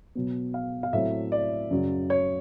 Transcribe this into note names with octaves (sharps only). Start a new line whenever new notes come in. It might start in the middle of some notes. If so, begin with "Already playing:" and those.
B2 F#3 B3
F5
F5
A2 F#3 A3 C4 E5
D5
F#2 C#3 F#3
C#5